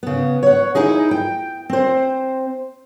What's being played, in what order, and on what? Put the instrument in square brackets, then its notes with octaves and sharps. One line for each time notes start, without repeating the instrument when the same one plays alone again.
[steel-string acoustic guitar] C#3 B3
C#5 F#5
D#4 E4 G#4 D#5
G5
C4 C5